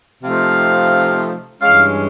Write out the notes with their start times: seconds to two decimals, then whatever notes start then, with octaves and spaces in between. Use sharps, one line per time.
0.24 C3 F3 A3 C4 D#4 F5
1.62 G2 E3 G#3 C#4 F5